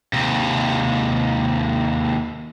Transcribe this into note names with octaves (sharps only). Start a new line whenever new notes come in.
D#2 C3